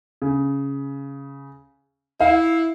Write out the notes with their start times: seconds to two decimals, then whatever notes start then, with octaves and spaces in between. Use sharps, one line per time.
0.22 C#3
2.20 E4 F5